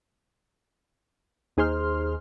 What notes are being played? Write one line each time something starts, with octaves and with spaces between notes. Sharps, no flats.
D#2 D#4 G#4 C5 C6 F6